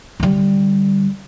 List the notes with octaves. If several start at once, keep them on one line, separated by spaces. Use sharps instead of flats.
D3 G3